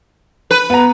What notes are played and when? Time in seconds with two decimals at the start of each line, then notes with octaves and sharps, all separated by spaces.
0.51 B4
0.70 B3 A#5